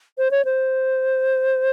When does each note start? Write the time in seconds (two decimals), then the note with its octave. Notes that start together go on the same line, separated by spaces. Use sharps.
0.18 C5
0.31 C#5
0.45 C5